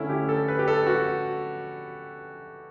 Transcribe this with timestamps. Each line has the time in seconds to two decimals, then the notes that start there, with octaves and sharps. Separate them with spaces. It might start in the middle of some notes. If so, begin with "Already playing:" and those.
Already playing: D3 A3 C#4 E4
0.09 G4
0.29 A4
0.48 B4
0.59 G4
0.68 A4
0.87 F#4